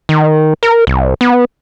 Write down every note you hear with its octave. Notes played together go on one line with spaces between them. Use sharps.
D#3
A#4
C2
B3